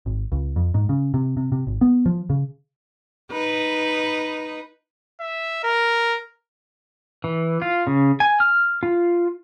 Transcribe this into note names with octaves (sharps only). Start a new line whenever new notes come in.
G#1
C#2
F2
G#2
C#3
C3
C3
C3
G#1
B3
F3
C#3
D#4 B4
E5
A#4
E3
F4
C#3
G#5
F6
F4